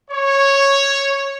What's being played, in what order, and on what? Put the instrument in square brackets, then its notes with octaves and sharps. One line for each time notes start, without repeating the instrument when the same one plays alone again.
[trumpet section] C#5